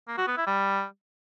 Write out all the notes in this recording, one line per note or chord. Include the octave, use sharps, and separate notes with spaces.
A#3
F#4
B3
E4
G3